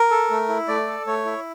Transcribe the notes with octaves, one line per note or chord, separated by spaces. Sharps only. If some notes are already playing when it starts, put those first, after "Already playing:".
Already playing: A#4
A4
A3
E4
A3 D5
A4
A3 C#5
E4